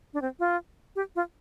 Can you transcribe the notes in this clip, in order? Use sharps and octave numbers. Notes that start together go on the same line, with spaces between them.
D4
C4
F4
G4
F4